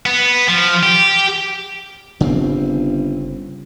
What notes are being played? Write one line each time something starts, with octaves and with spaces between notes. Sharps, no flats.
B3
F3
G4
G1 C#3 C4